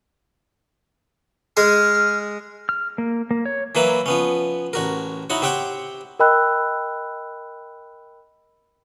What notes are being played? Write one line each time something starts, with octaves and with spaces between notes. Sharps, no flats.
G#3 G#4 F6
F6
A#3
A#3
C#5
E3 F#3 A#3 E4 B4
F3 B3 C#4
A1 F#4 A#4
D#4 E4 F#4 C#5
C4 G4 C#5 F#5 G5
A#4 D#5 G5 B5 E6 F#6